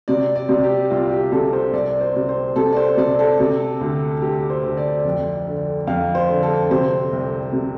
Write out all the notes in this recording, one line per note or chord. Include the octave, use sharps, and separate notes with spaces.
C3 D5
D5
C3
G4
C2 F4
G4
C3 A4
C5
C2 D5
C5
C3
C5
C3 A4
D5
C5
C3 D5
A4
C3
D2
D2 G4
C5
D2
D5
F2
D3
F2 F5
C5
D3
A4
C3 C5
C2
C3